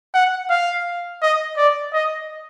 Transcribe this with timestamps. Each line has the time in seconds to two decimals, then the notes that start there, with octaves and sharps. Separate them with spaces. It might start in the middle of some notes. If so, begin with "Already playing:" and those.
0.14 F#5
0.50 F5
1.22 D#5
1.57 D5
1.93 D#5